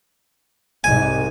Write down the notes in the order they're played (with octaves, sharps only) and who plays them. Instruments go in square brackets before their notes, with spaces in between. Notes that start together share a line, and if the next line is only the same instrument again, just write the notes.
[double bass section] C2 G#2 [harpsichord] G#5